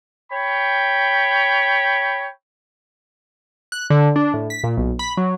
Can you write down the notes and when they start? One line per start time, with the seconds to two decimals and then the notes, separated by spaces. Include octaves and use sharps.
0.32 C#5 G5 B5
3.72 F#6
3.90 D3
4.16 D4
4.34 A2
4.50 B6
4.64 A#2
4.77 B1
4.99 B5
5.17 F#3